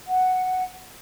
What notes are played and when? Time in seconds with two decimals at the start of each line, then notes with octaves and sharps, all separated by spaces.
0.08 F#5